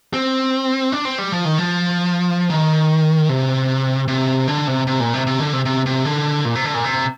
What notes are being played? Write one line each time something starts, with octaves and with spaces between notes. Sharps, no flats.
C4
D4
C4
G3
F3
D#3
F3
D#3
C3
C3
D3
C3
C3
A#2
C3
C3
D3
C3
C3
C3
D3
A#2
C3
D3
A#2
C3